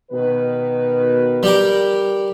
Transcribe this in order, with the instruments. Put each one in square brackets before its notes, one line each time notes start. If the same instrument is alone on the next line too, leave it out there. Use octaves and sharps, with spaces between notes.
[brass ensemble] B2 D#3 B4
[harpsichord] G3 G4 A#4